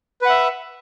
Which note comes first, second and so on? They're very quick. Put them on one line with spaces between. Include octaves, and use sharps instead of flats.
B4 F#5 E5